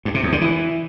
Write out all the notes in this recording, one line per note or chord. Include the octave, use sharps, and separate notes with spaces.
G2
C3
E2
D3
E3